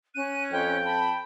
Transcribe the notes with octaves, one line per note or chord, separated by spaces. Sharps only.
C#4 F#6 D#7
F2 G5
A5 B5